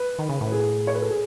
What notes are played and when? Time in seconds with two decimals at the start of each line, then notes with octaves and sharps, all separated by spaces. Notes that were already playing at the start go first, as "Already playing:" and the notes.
Already playing: B4
0.19 D#3
0.29 C#3
0.41 A2
0.52 G#4
0.87 C#5
0.95 B4
1.02 A4
1.11 G#4